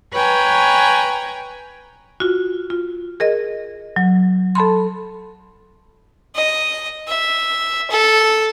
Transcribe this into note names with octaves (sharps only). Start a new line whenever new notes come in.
B4 C#5 G5 G#5 A#5
F4 F#4
F4
G#4 A#4 D#5
F#3
A4 A5 B5 C6
D#5
E5
A4